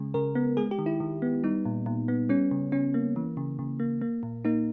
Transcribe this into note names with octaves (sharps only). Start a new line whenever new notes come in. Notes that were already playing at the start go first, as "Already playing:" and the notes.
Already playing: C#3 G#3
C#3 A#4
B3
G#3 G#4
G4
D#3
E4
D#3
B3
G3 D#4
A#2
A#2
B3
G3 C#4
C#3
C#3 C#4
A#3
E3
C#3
C#3
A#3
A#3
A#2
A#3 D#4